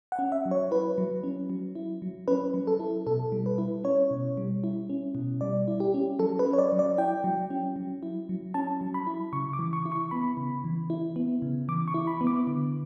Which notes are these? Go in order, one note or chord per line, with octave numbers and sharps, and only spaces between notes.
F#5
C#4
E5
F#3
C#5
E4 B4
F#3
C#4
F#3
E4
F#3
C#4 B4
F#3
A4
E4
B2 A4
G3
B4
E4
C#4 C#5
B2
G3
E4
C#4
B2
G3 D5
E4
G4
C#4
F#3 A4
B4
C#4
C#5
D5
F#3
D5
E4 G5
F#3
C#4
F#3
E4
F#3
C#4 A5
F#3
B5
E4
C#3 C#6
D6
E3
C#6
E4
C#6
B3 B5
C#3
E3
E4
B3
C#3
E3 D6
C#6
E4
B5
B3
D6
D3